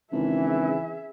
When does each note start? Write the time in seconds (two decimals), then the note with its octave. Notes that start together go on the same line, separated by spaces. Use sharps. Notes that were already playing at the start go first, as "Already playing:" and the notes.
0.12 G#1 C#3 E3 G#4 E5